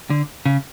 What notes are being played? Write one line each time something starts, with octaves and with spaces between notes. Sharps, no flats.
D3
C#3